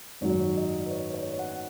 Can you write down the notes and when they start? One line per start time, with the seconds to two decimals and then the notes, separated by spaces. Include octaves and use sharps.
0.21 G#1 F#2 D#3 F#3 C#5
0.57 D#5
0.86 B4
0.91 C#5
1.14 C#5
1.38 F#5